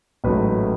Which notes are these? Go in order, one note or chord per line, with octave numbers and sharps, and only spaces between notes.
A1 G#2 F#3 A3 B4